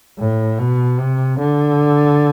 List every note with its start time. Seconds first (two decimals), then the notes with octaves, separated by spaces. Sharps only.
0.19 A2
0.59 B2
0.99 C3
1.39 D3